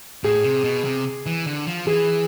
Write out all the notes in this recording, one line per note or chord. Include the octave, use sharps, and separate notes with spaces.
A2 G#4
C3
B2
C3
E3
D3
F3
E3 G#4